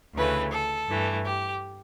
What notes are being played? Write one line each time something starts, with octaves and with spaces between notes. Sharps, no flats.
D2 C#3 E3 A3 B4
A4
G2 E3 A3
G4